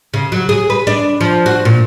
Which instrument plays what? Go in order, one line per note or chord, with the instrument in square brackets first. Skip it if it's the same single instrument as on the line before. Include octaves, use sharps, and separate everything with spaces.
[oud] C#3
F#3
G#4
B4
D4
F3
F#4
A#2